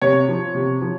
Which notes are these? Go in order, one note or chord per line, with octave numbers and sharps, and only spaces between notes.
C3 C#5
F3
C3
F3